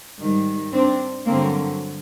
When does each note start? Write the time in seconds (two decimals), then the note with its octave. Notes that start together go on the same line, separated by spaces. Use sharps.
0.19 G#2 D#3 G3
0.72 C4 D4
1.26 G2 D3 F#3 A#3 C4